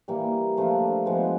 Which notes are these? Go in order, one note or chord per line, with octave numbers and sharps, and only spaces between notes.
E3 G3 A#3
F3 A3 D4 F4
F3 G#3 B3